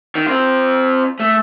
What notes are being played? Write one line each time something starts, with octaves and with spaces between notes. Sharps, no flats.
D#3
C4 F4
A3